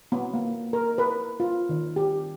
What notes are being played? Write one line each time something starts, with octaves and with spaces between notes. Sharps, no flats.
B3
A#3
A#4
B4
F4
D#3
G4